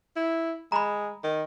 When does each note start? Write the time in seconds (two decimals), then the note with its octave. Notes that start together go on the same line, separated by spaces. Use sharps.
0.16 E4
0.72 G#3 A#5 B5
1.24 D#3